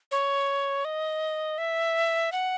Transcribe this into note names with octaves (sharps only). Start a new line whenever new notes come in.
C#5
D#5
E5
F#5